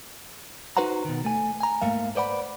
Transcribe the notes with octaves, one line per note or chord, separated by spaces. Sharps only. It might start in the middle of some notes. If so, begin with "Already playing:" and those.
D#4 F#4 B4 C5 F#5 A#5
B2 D#3
A3 G#5
G#5 A#5
G#2 A3 A#3 F5
B4 C5 D5 F#5 B5